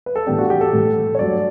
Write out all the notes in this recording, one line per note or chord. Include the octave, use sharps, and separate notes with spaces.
B4
A4
A2 E3 G3 B3 D4 G4
F#4
G4
A4
A2 E3 G3
C#5
G2 F#3 A3 D5